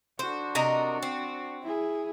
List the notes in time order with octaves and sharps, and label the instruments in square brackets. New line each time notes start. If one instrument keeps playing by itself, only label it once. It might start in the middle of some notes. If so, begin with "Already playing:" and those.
[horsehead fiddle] D4 F#4 [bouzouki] C5
[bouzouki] C3 A#4 D#5
C4
[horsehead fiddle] E4 G#4